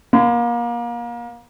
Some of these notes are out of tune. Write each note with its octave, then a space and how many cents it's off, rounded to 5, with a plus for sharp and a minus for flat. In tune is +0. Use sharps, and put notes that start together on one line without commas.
A#3 +30 C6 -40